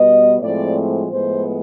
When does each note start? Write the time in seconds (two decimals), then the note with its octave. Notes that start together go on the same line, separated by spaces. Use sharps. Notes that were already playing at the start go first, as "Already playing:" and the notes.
Already playing: B2 G3 B3 D#5
0.41 A2 F3 G#3 C4 D5
1.10 A2 F3 G#3 B3 C5